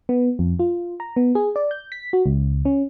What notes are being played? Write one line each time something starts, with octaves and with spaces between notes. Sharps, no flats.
B3
F2
F4
A#5
B3
G#4
D5
G6
B6
F#4
C#2
C#4